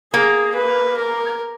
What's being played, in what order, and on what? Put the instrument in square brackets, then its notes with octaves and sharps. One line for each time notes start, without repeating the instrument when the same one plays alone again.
[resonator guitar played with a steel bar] A#3 [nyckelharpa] G#4
[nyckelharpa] B4
A#4